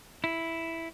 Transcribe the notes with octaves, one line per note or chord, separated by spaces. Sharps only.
E4